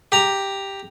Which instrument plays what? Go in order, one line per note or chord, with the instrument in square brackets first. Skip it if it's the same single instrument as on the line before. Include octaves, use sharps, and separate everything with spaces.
[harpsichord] G4 A#5